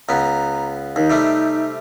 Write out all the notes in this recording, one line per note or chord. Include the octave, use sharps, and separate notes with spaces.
C#2 B3 A#5
D#2 D#4
C3 G3 A3